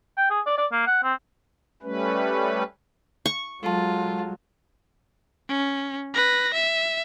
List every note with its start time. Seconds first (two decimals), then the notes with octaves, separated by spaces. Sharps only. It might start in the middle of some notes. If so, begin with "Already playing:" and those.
0.17 G5
0.30 G#4
0.46 D5
0.58 D5
0.72 A#3
0.87 F#5
1.03 C4
1.82 G3 A3 C#4 B4
3.26 C#6
3.63 F#3 G#3 F4 A4 A5
5.49 C#4
6.14 B4 A#6
6.54 E5